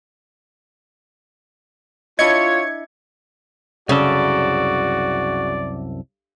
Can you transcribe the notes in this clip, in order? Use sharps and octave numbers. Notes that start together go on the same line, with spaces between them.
D4 E4 F4 C#5 D#5 G#6 C#7
C2 F#2 C#3 F#4 A4 D5